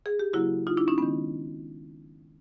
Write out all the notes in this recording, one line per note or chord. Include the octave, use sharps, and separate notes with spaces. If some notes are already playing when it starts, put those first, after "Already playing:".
G#4
G4
C#3 F#3 A#3 E4 F#4
D#4 F4
D4 E4
C#4 D#4
D#3 G#3 B3 C#4